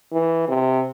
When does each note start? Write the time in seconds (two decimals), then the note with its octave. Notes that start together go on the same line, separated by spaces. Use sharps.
0.12 E3
0.49 C3